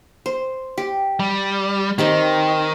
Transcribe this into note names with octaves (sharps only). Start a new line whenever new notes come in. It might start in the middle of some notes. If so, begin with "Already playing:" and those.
C5
G4
G3
D#3 C4 D#4 G4